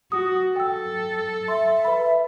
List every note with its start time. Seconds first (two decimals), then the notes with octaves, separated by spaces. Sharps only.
0.12 F#4 D#6
0.56 A4 G5 E6
1.48 E5 C6
1.85 B4 B5